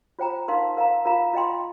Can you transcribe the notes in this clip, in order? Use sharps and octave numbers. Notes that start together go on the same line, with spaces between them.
F4 C5 G5 A#5
D#4 A#4 F5 C6
A#4 F5 A#5
F4 A#4 F5 A#5
F4 D#5 G5 C6